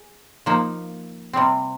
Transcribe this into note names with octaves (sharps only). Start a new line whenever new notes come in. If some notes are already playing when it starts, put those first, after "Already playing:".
Already playing: G#4
F3 A#3 D#4
C3 G3 C4